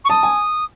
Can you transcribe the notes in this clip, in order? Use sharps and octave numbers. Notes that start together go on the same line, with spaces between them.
C#6
A5 D#6
G#5